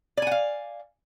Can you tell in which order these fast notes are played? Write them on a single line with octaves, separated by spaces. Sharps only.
D5 G#5 F#5 F5